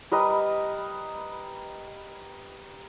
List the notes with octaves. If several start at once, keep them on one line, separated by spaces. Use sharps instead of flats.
G3 A#4 B4 D#5